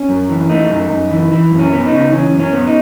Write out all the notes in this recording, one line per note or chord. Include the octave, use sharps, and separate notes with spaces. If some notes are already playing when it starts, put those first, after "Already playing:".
Already playing: C#4
F#2
E3
A3 D#4
F#2
F#2
E3
E3
F#2
C#4
B3
D#4
C#3
E3 C#4
F#2
C#4
B3
D#4